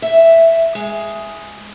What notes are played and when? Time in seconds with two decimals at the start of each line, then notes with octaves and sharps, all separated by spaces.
0.02 E5
0.75 G#3